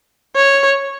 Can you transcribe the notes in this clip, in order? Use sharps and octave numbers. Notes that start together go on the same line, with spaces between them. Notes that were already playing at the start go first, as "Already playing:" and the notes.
C#5